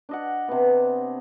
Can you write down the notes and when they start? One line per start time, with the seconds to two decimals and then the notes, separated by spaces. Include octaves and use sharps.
0.09 D4 D#5 F#5
0.48 C3 B3